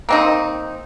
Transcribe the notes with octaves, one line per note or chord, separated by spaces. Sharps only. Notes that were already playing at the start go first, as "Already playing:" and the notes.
A#3 C4 D#4